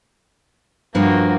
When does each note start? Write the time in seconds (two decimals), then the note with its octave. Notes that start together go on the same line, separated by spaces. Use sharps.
0.95 G2 F3 A#3 F#4